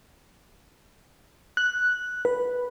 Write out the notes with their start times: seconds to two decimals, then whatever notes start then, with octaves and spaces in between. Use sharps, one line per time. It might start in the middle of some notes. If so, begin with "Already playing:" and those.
1.57 F#6
2.25 B4